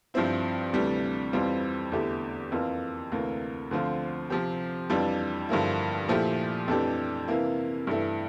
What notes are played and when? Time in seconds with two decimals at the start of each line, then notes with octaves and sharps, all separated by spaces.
0.14 G2 F3 C4 E4
0.73 D2 C3 E3 G3 D4
1.33 F2 E3 G3 C4 F4
1.92 E2 D3 A3 E4 G4
2.52 F2 E3 A#3 F4
3.11 D2 C3 E3 A#3
3.71 D2 D3 F3 C4 F4
4.30 C3 F3 C4 G4
4.90 F2 E3 G3 D4 F4
5.49 G2 D3 F3 A#3 E4
6.08 A#2 F3 A3 E4 G4
6.68 F2 E3 A3 D4 G4
7.28 C3 E3 A#3 E4
7.87 G2 E3 A3 E4